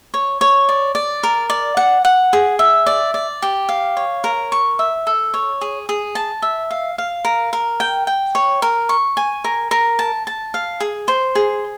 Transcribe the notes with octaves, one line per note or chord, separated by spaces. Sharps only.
C#5
C#5
D5
D5
A#4
D5
F#5
F#5
G#4
E5
D5
D5
G4
F5
C#5
A#4
C#6
E5
A4
C#5
G#4
G#4
A5
E5
F5
F5
A#4
A#4
G5
G5
C#5
A#4
C#6
G#5
A#4
A#4
A5
A5
F5
G#4
C5
G#4